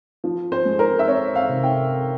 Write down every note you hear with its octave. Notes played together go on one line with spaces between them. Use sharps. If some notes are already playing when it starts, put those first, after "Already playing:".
F3
C5
G#3
A#4
E5
C4 C#5
F5
C3
G5